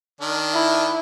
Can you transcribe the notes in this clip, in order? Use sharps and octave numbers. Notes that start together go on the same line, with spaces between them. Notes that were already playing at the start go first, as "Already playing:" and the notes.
D#3 D4
E4